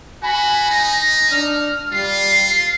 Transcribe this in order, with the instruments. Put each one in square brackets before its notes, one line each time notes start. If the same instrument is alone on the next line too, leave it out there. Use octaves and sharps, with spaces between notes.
[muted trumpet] F#4 [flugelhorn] G#5 [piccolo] B5
[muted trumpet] D#4 [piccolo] A#6
[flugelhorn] D4 [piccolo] F6
[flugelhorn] G3 [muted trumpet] F4 [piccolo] C7